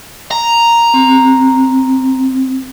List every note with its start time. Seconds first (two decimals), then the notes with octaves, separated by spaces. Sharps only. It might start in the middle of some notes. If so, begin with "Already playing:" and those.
0.31 A#5
0.94 C4